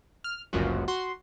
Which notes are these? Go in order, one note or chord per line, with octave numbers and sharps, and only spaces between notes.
F6
G1 C#2 F#2 A#2 F3 F#4
F#4 C6